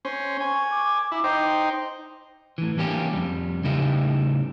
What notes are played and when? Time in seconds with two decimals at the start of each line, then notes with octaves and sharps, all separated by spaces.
0.05 C#4 C5
0.40 G#5 C#6
0.71 D6
1.12 E4
1.24 D#4 C5 G5
2.58 A2 E3
2.77 E3 G3 A#3 C#4 D4 G4
3.13 F2 G3
3.64 A2 C#3 G3 D#4 E4 G4